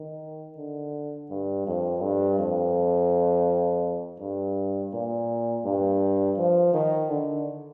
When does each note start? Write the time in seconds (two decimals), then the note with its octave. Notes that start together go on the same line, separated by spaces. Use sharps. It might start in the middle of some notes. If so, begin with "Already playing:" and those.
Already playing: D#3
0.57 D3
1.30 G2
1.67 F2
2.02 G2
2.39 F2
4.20 G2
4.93 A#2
5.65 G2
6.38 F3
6.74 D#3
7.10 D3